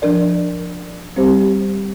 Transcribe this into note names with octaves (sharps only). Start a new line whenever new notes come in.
F3 D4 A#4 D5
G3 C4 G4 C5